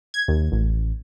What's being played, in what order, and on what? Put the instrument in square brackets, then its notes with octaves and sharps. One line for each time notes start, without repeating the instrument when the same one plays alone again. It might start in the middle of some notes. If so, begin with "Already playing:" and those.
[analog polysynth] G#6
D#2
A1